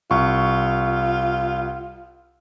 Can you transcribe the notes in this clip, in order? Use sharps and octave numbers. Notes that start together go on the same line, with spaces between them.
C2 F4 C#6